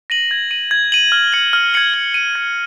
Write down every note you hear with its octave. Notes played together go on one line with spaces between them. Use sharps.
A#6 D#7 F#7
G#6
D#7 F#7
G#6
D#7 F#7
F6
G#6 C#7 F#7
F6
G#6 C#7 F#7
G#6
D#7 F#7
G#6